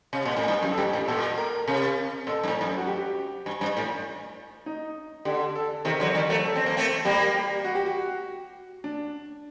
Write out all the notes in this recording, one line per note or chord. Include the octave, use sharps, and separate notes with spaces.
C3
A#2
A2
G2
F#2
A4
G2 G4
A2
A#2 A4
A#4
C3 A#4
A#2 A4
G2
A2
G2
F#2
F#4
G4
G2
G2
A2
D#4
D3 G4
A4
C3 D#3 A#4
D3 F#3
D#3 G3
F#3 A3
A4
C4
A#3
A3 C4
G3 A#3 G4
G4
F#4
G4
F#4
D4